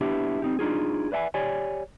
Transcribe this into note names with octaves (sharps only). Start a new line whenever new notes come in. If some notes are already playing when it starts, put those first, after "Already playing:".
B3 D4 E4 G4
C4 D#4 G4
D4 D#4 F4 G#4
B4 D5 E5 G5 G#5
G4 C#5 D5 G#5